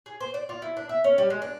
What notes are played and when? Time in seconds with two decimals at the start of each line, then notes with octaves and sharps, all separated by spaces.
0.06 G#4
0.21 C5
0.34 D5
0.49 F4
0.62 E4
0.77 D4
0.89 E5
1.04 C#4
1.18 G3
1.30 G#3
1.42 D4